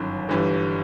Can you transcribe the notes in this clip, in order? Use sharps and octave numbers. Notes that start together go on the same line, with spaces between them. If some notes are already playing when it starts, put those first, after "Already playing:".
Already playing: G1 F#2 D#3
G1 G2 E3 G3